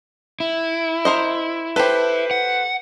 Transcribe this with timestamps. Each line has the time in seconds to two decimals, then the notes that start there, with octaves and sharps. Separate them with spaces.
0.40 E4
1.05 A#4 C5 D#5
1.76 G4 A4 B4 C5
2.31 F#5